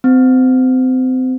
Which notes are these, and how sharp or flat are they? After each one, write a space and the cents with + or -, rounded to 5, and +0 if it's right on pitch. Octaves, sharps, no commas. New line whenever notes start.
C4 -30